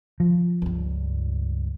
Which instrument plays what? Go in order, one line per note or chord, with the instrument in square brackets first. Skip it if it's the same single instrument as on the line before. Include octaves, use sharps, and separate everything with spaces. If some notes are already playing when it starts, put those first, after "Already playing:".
[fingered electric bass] F3
[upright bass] C#2 G2